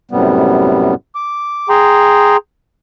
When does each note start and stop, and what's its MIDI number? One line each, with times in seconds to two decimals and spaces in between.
0.11 0.94 42
0.11 0.94 45
0.11 0.94 48
0.11 0.94 55
0.11 0.94 59
1.15 1.69 86
1.69 2.37 68
1.69 2.37 79
1.69 2.37 82
1.69 2.37 84